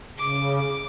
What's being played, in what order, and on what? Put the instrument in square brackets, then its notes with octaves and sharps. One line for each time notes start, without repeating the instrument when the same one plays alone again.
[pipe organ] C#3 [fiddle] D6